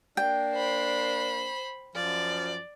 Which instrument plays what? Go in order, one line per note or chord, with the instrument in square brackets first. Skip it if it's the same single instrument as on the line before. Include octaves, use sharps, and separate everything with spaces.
[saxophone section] A#3 D4 [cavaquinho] G5
[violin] C5 B5
[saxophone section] F#2 F3 [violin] D5